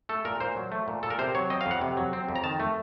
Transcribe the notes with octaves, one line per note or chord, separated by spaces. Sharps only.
A3 A4
A#2 A#4
A#2 C5
F#3
A3
A#2
A#2 A4
A#4
C3 C5
F#3 C#5
C4 D#5
F5
F2
F#5
C3
F#3
C4
F2
A#5
D#3 A5
A3